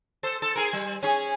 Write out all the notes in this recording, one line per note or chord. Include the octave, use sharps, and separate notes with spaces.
A4 C5
A4
G#4 A#4
G3
C#4 G#4